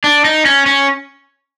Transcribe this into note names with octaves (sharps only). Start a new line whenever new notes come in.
D4
D#4
C#4
C#4